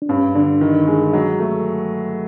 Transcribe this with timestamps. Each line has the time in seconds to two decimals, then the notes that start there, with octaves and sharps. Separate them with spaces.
0.02 D4
0.09 G2 C#4
0.35 D3 D4
0.61 D#3
0.87 G#3
1.13 F#3
1.40 A3